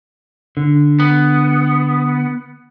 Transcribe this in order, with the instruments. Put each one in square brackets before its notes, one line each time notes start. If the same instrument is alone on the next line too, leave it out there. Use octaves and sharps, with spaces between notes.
[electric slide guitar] D3
[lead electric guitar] B3